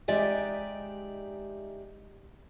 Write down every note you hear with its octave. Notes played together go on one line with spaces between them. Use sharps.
G#3 D#4 G4 D5 E5 G#5